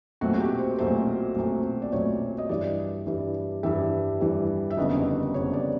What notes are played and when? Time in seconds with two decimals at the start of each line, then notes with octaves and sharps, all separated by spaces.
0.21 B1 A#2 F#3 A3 C4 F#4
0.34 F#4
0.41 G4
0.59 C5
0.78 B1 A#2 F#3 A3 C4 C5
1.35 B1 A#2 F#3 A3 C4
1.82 D5
1.92 B1 A#2 F#3 A3 C4 C#5
2.38 D#5
2.49 G2 E3 G3 D5
3.07 G2 E3 G3
3.63 G2 E3 G3 E5
4.21 G2 E3 G3
4.71 E5
4.77 F#1 F2 D3 G3 B3 D#5
5.34 F#1 F2 D3 G3 B3 C#5
5.53 D5